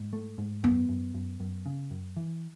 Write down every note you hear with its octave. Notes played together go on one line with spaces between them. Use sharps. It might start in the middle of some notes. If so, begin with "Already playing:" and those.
Already playing: G#2
A3
G#2
F#2 B3
F#2
F#2
F#2
C#3
F#2
E3